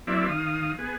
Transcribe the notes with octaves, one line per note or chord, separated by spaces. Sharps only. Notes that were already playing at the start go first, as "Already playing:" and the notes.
F#3 A#3 C4 E4 D5 E5
D#3 F5 D#6
B3 G#4